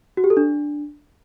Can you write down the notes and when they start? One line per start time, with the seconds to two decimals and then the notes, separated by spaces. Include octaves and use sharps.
0.17 F#4
0.24 G4
0.30 A4
0.37 D4